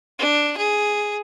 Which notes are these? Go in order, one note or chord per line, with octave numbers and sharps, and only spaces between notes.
D4
G#4